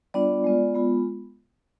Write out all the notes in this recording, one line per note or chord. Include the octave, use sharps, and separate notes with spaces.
G3 B3 D4 F4 D5
G#3 B3 F4
G#3 B3 F4